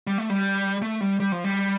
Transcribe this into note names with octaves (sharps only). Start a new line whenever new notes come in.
G3
A3
G3
A3
G3
G3
F3
G3